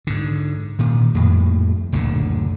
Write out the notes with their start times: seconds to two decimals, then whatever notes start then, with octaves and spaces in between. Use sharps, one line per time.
0.07 G#2 D3
0.79 A#2 D#3
1.14 F2 A2 A#3
1.92 F#1 D2 A#2 D3